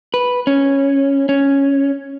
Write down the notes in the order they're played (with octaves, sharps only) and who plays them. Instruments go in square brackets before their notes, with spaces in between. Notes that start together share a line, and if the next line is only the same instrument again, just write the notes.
[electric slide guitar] B4
C#4
C#4